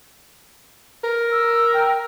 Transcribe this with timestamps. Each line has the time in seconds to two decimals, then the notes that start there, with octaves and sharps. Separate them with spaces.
1.04 A#4
1.32 E6
1.74 G5